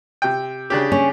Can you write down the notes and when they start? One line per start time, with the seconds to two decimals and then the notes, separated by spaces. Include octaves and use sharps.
0.22 C3 G5
0.70 C#3 D4 G4
0.92 C#4